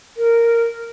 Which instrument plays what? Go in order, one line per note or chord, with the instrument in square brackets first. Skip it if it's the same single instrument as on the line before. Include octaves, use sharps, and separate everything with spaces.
[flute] A#4